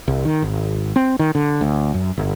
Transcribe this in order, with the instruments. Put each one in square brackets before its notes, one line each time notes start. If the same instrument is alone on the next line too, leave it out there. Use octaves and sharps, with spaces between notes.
[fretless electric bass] C2
D#3
G#1
C4
D#3
D3
D2
F#2
G1